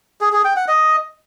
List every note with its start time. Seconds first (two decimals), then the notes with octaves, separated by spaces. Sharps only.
0.21 G#4
0.33 G#4
0.45 G5
0.56 F#5
0.68 D#5